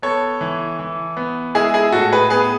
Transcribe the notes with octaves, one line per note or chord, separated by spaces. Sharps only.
B3 A4 C#5
E3
E3
B3
G#3 E4 G#4
E4 G#4
A2 F#4 A4
G#4 B4
B3 G#4 B4